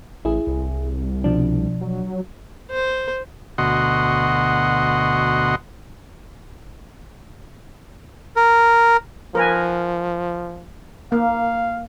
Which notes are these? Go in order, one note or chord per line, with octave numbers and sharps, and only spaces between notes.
A1 E4 G#4
C2
B2 F3 D4
F#3
C5
D2 B2 F#4 D#5 F#5 C6
A#4
F3 A#4 B4 G#5
A#3 F5